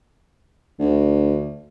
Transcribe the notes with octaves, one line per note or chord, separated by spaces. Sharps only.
D2